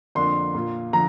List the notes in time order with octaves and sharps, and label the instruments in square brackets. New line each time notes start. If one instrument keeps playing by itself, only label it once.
[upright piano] F2 D3 A#3 D4 [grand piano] C6
[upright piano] A#2 A#3 F4
[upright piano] D3 F3 [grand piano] A#5